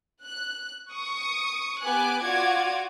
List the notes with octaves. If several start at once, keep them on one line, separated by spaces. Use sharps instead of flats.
F#6
C#6 D#6
B3 G4 G#5 D6 F#6
F4 F#4 D5 F#5 D6 G#6